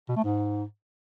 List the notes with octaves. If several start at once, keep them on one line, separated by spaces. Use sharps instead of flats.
B2
A3
G#2